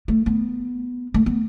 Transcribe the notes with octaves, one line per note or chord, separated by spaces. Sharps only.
A3
B3
A3
B3